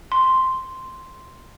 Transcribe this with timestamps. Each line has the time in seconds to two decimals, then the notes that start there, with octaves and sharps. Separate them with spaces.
0.12 C6